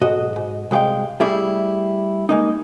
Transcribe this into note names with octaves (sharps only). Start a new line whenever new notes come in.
B1 G#2 F#4 D#5
G#2
C2 G#3 G4 F5 G5
G3 A3 E4 G4 G#4 E5
G#3 A#3 D#4